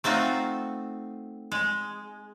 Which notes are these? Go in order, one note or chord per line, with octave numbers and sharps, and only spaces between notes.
A3 C4 D#4 F4 F#4
G#3